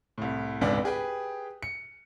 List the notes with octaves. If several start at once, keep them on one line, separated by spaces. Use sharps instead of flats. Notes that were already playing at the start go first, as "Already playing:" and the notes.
C2 A2
D#1 G#1 C#2 B3 D4 D5
G4 G#4 B4 G5
C#7